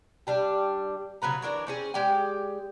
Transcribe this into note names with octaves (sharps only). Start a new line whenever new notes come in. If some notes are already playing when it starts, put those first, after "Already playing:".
G3 D4 G4
C#3 F#3 B4 A#5
E3 D4 A#4 C#5
C4 C#4 G#4
G#3 G4 D5 G5